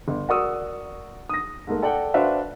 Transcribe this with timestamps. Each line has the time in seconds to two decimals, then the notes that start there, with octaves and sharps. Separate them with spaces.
0.08 G1
0.29 F#4 A#4 D5 C#6 D#6 E6
1.29 D#6 A#6
1.67 G#2 A3 A#3
1.82 A4 D5 F#5 G5
2.14 D4 F#4 B4 C5 E5 F5